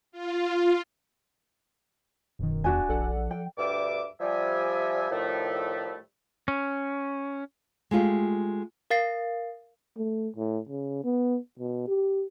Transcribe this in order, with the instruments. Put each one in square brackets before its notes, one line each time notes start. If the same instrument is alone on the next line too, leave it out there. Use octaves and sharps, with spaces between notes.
[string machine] F4
[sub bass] D1 [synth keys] F#2 B2 D#3
[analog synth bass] E2 [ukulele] D4 F#4 G#5
[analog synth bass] A#1 [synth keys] A4 D5 F#5
[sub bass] F3
[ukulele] G5
[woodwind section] D2 G2 G3 E5 D6
F3 G3 E5 G#5
A2 D#3 F3 G3 A3
[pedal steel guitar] C#4
[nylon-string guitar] G#3 A3 F4 G4
[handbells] A#4 F5 A6 C7
[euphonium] A3
A2
C#3
B3
B2
G4